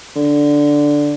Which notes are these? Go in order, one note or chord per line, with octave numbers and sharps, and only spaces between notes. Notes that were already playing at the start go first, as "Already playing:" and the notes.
D3